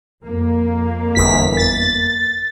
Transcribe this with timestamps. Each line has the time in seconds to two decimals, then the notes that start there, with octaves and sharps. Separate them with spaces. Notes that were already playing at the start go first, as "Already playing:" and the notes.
0.23 F2 A#3
1.15 G1 E2 B6
1.57 A6